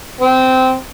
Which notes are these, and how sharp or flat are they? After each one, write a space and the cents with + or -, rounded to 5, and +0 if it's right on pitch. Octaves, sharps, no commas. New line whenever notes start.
C4 -15